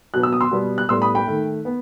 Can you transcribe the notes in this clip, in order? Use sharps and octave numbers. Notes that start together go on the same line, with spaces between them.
B2 F#3 B3 F#6
E6
D#6
C6 E6
B2 G3 B3
F#6
A2 G3 B3 C6 E6
B5 D#6
G5 B5
D#3 A3
B3